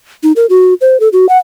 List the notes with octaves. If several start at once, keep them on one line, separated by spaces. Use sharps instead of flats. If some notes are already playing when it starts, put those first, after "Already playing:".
D#4
A#4
F#4
C5
A4
F#4
F#5